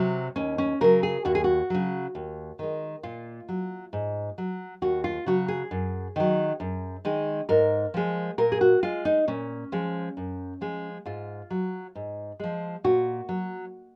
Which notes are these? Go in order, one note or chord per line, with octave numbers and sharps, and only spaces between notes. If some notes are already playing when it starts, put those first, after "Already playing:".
Already playing: C3 F#3
D#2 C#4
C#4
C#3 F#3 A#4
G#4
D#2 F#4
G#4
F#4
C#3 F#3
D#2
D#3 G#3
A#2 F4
F#3
G#2
F#3
D#2 F#4
F4
C#3 F#3 F#4
G#4
F#2
D#3 F#3
F#2
D#3 G#3
G#2 A#4
F3 G#3
A#2 A#4
G#4
F#4
G#3 F4
D#4
A#2 C#4
F3 G#3
F#2
F3 G#3
G#2 F4
F#3
G#2
F3 G#3
A#2 F#4
F#3